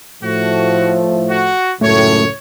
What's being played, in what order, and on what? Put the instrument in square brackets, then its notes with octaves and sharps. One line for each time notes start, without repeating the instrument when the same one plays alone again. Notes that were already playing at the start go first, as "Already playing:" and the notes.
[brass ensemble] A2 F3 A3 [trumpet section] F#4
[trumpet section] F#4
[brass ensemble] C#2 F#2 A2 [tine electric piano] A3 [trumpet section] C#5